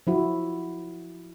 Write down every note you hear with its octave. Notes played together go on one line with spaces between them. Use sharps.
F3 E4 F#4